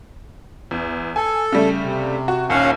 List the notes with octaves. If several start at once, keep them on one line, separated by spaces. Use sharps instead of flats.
E2
A4 G#5
C#3 G3 A3
C3
F#4
A#1 D#2 C#4 F5 F#5